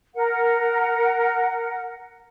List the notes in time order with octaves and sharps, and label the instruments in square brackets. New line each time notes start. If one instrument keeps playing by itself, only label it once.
[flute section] A#4 F#5